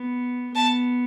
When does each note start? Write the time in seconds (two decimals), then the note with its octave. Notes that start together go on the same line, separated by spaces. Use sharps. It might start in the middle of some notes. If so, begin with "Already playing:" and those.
Already playing: B3
0.55 B3 A5